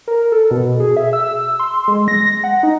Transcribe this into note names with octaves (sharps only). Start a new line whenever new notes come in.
A#4
A4
B2
G#4
E5
E6
C6
G#3
A#6
F#5
D#4